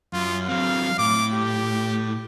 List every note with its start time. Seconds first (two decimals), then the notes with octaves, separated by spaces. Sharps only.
0.13 F#2 F4
0.48 F#3 C4 F5
0.98 A2 D6
1.34 G4